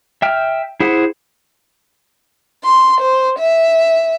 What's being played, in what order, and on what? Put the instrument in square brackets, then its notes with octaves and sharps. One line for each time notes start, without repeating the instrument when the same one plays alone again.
[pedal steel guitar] E5 G5 F6
E4 G#4 C5 F#5
[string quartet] C6
C5
E5